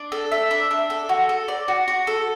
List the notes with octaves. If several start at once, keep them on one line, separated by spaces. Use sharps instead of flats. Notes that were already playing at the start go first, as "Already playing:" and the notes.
Already playing: D4
A4
E5
D4
D4
A4
F#4
A4
D5
F#4
F#4
A4